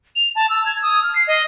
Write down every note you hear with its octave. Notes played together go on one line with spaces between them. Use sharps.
F7
A5
E6
G#6
D#6
F6
C7
D#5